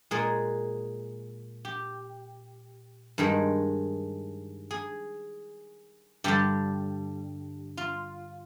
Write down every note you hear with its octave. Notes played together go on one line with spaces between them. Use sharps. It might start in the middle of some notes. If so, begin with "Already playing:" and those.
A#2 G#3 G#4
G4
G2 D#3 G#3
G#4
G2 D3 G3 G4
F4